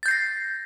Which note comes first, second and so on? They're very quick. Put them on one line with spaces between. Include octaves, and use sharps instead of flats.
A6 G6 C7 A#6